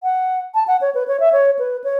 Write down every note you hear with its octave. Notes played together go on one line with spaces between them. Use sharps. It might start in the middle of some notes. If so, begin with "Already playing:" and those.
F#5
A5
F#5
C#5
B4
C#5
E5
C#5
B4
C#5